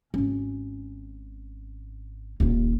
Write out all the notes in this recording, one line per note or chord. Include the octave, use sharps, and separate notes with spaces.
G#1 C#4
D#1 D#2